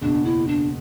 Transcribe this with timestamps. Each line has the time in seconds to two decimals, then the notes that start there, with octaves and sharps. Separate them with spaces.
0.01 F#1 E2 B2 D4
0.25 E4
0.47 D4